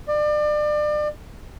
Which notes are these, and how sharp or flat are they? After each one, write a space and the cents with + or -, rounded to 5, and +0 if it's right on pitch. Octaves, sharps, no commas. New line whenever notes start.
D5 +30